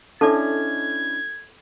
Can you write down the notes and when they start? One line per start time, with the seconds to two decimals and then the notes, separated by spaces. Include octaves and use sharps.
0.21 C#4 D4 E4 A4 D5 D#5 A5 G#6